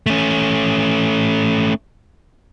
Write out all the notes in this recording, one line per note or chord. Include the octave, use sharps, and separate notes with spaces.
A3 C#4